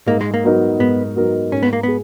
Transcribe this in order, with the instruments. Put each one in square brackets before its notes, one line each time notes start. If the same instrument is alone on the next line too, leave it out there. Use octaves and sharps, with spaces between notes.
[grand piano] G#2 [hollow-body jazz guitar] A#3
[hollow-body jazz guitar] G#3
A#3
[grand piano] F#3 B3 D#4 A#4
[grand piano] G#2 [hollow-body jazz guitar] B3
[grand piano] F#3 B3 D#4 A#4
[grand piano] G#2 [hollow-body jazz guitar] C#4
[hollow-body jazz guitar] B3
A#3
[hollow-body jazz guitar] B3 [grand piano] G#4